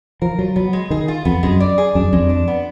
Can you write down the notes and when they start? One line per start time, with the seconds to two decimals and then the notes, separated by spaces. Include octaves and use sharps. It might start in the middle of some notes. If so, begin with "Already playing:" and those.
0.22 F3 A#4
0.39 F#3 F4
0.56 F#3 B3
0.73 G#3
0.90 D#3 G#4
1.08 F4
1.25 F2 B3
1.43 F#2 G#3
1.60 D5
1.78 G#4
1.95 F#2 D4
2.13 F2 G#3
2.29 D4
2.48 B3